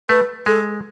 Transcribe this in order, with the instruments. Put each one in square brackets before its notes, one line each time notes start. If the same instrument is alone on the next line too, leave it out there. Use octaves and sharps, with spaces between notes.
[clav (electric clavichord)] A3 [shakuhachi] B4
[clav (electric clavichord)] G#3 [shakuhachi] A4